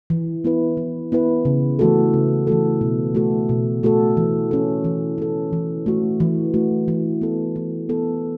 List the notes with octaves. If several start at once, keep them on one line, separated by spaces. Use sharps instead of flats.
E3
B3 E4 B4
E3
B3 E4 B4
C#3
E3 A3 F#4 A4
C#3
E3 A3 F#4 A4
B2
A3 F#4 A4
B2
A3 F#4 A4
E3
C#4 A4
E3
C#4 A4
E3
A3 F#4
E3
A3 F#4
E3
B3 A4
E3
B3 A4